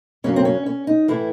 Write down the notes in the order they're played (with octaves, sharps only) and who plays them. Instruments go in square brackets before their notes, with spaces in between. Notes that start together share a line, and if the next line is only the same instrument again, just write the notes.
[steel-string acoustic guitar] F#2 C#3 F#3 C#4
C4
C#4
C#4
D#4
A2 E3 E4